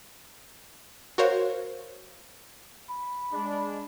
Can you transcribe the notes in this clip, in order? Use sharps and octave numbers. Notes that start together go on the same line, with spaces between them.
F#4 A#4 C5 C#5 F5
B5
G#3 D4